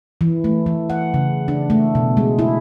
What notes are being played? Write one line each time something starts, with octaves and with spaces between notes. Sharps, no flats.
E3
A3
E3
F#5
C#3
D4
A3
B2
G#3
E4